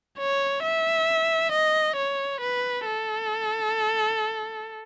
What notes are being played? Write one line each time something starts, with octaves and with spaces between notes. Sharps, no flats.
C#5
E5
D#5
C#5
B4
A4